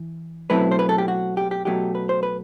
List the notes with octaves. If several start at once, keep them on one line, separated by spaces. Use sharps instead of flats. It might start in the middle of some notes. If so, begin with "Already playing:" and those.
Already playing: E3
B2 F#3 A3 C4 E4 B4
C5
B4
A4
G4
F#4
G4
G4
B2 F#3 A3 D#4 G4
B4
C5
B4